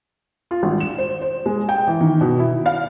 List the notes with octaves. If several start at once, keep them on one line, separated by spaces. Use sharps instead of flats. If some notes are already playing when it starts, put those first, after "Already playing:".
F4
G#1
E7
C5
C5
G#3
G5
E3
D#3
B2
E4
F5